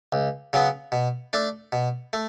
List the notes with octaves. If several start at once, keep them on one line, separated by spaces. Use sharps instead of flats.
C#2
C#3 F#3 B3
B2
A3 D4
B2
A3